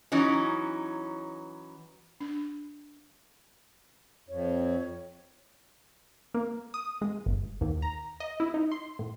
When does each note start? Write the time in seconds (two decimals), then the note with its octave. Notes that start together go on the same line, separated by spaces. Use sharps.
0.12 E3 F#3 C#4 D#4
2.20 D4
4.29 F2 C#5
6.34 A#3
6.74 D#6
7.01 G#3
7.26 G1
7.61 D#2
7.82 A#5
8.20 D#5
8.40 E4
8.54 D#4
8.72 C6
8.99 A2